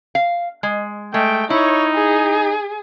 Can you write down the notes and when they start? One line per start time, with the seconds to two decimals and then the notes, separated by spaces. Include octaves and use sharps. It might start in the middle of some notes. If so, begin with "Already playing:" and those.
0.15 F5
0.63 G#3
1.14 G#3 A3 G5
1.50 D#4 E4 C#5
1.94 G#4